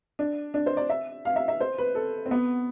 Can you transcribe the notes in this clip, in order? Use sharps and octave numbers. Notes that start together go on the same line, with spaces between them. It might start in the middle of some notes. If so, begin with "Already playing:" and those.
D4
D4
C5
D5
E5
F5
E5
E5
C5
B4
A4
C4
B3